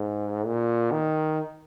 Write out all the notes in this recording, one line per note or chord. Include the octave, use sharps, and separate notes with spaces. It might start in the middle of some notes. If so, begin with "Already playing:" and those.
Already playing: G#2
A#2
D#3